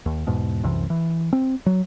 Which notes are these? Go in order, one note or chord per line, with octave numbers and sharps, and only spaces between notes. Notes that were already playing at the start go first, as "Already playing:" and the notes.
D#2
E2 G#2 B2
C2 F#2 C3 E3
E3
C4
F#3